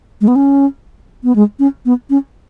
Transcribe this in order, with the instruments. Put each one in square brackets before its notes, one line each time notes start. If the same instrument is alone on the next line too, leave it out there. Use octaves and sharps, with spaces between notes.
[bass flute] G#3
B3
C#4
B3
G#3
C#4
B3
C#4